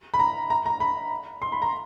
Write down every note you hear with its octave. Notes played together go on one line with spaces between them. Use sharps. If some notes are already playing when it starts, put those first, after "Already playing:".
B5
A#5
A#5
A#5
B5
C6
B5
A#5